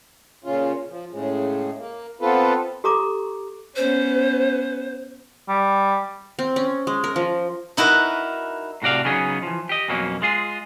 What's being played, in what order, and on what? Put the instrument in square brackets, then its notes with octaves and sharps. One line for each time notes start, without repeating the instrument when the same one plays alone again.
[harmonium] A#2 C#3 C#4 F4
F3
A2 C#3 G#3
A#3
B3 C4 F4 A4 B4
[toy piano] G4 A4 A#5 C#6 D6
[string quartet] B3 C#4 [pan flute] C5
[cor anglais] G3
[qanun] C4
C#4
G#3
A#4
F3
[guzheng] D#4 E4 F#4 A#4 B4
[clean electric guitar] A2 C3 F#4 D5 F5
C#3 F#3 B3 C#4 D#4 G#4
E3 F3
G4 D#5
F2 B2 F#3 A#3 C#4
G#3 F4 G#4